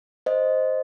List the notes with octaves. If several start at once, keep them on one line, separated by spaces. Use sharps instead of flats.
C5 D#5